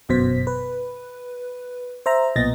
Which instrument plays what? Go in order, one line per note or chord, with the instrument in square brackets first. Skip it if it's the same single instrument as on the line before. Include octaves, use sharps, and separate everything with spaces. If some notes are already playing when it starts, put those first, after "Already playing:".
[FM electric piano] G1 F#2 B2 C5 B6
B4
C5 E5 A#5
B1 A#2 B3 D#5 A6 A#6